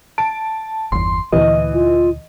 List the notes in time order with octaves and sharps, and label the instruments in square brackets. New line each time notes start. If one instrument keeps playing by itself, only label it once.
[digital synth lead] A5 [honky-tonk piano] D7
[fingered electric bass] G1 E2 [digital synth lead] C6
[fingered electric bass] D2 A#2 [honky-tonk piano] E3 [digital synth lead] D#5
[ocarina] F4